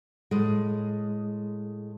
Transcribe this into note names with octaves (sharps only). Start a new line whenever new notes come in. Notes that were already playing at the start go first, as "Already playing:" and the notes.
A2 G#3